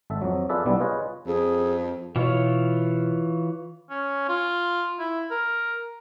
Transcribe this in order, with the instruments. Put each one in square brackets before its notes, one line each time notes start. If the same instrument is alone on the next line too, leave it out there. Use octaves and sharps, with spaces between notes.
[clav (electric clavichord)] G#1 A4 E5
F2 F#3
F4 G#4 A4 B4 D5 E5
B1 G3 B3 D4 E4
F4 G#4 B4 C#5 D#5
[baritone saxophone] F2 [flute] G#4
[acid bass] B2 [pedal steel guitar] E3 F4 C#5
[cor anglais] C#4
F4
E4
A#4